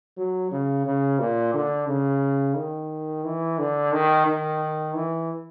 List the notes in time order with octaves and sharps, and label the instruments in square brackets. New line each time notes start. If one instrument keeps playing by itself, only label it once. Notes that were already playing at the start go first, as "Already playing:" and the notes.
[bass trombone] F#3
C#3
C#3
A#2
D3
C#3
D#3
E3
D3
D#3
D#3
E3